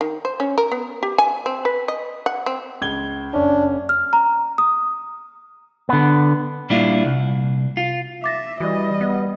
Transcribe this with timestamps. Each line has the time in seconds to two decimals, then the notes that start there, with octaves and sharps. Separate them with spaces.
0.01 D#3
0.25 C5
0.40 C#4
0.58 A#4
0.72 B3
1.03 G4
1.18 G#5
1.46 C4
1.65 B4
1.88 D#5
2.26 F#5
2.46 C4
2.82 C#2 G#6 G7
3.34 F#1 C#4 D4
3.89 F6
4.13 A#5
4.58 D#6
5.89 D3 B3
6.70 A#2 G3 A#3 D4 E4 F4
7.05 C2
7.77 F4
8.24 E5 D6 A6 A#6
8.60 E3 G3 F#4 D#5
9.01 B3